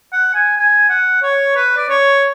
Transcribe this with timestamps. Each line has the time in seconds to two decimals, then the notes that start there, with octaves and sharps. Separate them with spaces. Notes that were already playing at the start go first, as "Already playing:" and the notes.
0.12 F#5
0.34 G#5
0.57 G#5
0.89 F#5
1.22 C#5
1.56 B4
1.77 D5
1.89 C#5